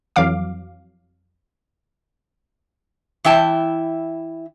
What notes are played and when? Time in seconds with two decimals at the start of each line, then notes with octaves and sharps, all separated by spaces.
0.16 F2 E3 F#3 F5 D6
3.24 E3 E4 G5 A5